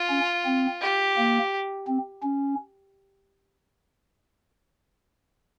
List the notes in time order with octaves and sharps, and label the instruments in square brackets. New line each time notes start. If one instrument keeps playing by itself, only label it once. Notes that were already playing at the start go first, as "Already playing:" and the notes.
Already playing: [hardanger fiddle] F4
[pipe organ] C#4
C4
[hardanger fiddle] G4
[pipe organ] A#3
C4
C#4